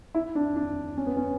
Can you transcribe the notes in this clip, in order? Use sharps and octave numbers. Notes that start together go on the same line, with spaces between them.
E4
D4
D4
C#4
B3
C#4